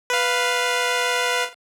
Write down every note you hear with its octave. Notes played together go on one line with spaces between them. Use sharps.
B4 F5